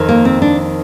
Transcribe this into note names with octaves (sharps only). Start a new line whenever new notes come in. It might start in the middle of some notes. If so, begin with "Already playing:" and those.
Already playing: F2 D#3
A#3
C4
D4